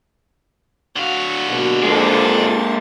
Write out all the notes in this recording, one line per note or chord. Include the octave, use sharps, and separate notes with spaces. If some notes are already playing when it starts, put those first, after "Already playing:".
D3 F#4 F5
D#2 G#2 B2
F2 G#3 A#3 D4 A5